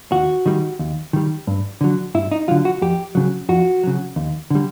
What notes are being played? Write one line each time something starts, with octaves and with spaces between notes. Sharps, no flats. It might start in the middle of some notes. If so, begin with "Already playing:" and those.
D#2 F#4
D#3 G3
D#2
D#3 G3
G2
D3 F#3
G2 E4
D#4
D3 F#3 F4
F#4
F2 G4
C#3 F#3
F2 F#4
C#3 F#3
D#2
D3 G3